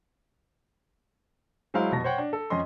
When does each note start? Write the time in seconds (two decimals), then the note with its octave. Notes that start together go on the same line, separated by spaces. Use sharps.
1.74 F#3 G#3 E4 C5 F5
1.91 F1 B2 A5 A#6
2.04 C5 C#5 F#5 G5
2.18 D4
2.33 A4
2.50 F2 C#4 D#5 C6